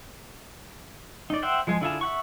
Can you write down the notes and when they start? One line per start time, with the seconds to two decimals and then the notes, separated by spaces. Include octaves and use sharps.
1.30 D#4 D5
1.42 C5 E5 F#5 G5
1.67 F3 G#3 G#4
1.81 D3 E4 F4 G#4 A5
2.01 E5 F#5 C#6